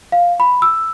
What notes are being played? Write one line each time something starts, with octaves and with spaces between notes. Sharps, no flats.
F5
B5
E6